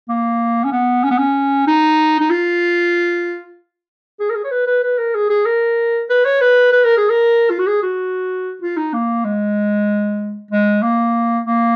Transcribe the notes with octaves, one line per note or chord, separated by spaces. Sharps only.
A#3
C#4
B3
C#4
B3
C#4
D#4
D#4
F4
G#4
A#4
G#4
C#5
B4
B4
B4
A#4
G#4
G#4
A#4
B4
C#5
B4
B4
A#4
G#4
A#4
F4
F#4
G#4
F#4
F4
D#4
A#3
G#3
G#3
A#3
A#3